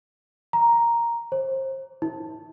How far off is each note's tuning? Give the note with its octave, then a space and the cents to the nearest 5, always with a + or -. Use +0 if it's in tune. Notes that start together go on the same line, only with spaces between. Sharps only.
A#5 +5
C5 +30
E4 -40